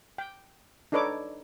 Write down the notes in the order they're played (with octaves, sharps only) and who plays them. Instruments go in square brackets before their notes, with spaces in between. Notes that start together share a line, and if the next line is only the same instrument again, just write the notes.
[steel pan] G5
D4 D#4 A4 B4 C#5 D6